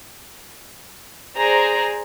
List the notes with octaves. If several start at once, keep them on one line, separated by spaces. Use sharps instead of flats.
G#4 C5 D5 A#5